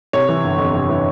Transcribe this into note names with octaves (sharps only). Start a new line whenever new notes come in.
C3 C#5
E3
G1
F2
C3
E3